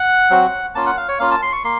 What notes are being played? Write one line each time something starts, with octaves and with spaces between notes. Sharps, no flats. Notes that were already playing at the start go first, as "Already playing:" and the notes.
Already playing: F#5
F#3 C4 F#4
A#3 C#4 F4 A5
F#5
F5
C#5
A#3 C#4 F4 F5
A5
C6
C#6
A#3 C6